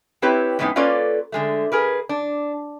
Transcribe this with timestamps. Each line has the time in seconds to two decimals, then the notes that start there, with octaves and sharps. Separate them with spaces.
0.22 C4 E4 G4 B4 C#5
0.59 F2 A2 G#3 B3 C#4 D#4
0.76 A#3 C#4 F4 A4 B4 D5
1.32 D3 G#3 A3
1.72 G#4 A#4 B4
2.09 D4